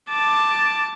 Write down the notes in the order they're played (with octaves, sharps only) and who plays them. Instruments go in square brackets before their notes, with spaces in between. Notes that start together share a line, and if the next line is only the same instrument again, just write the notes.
[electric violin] A5 D6